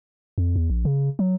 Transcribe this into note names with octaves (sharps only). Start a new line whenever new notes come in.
F2
E2
A#1
C#3
F#3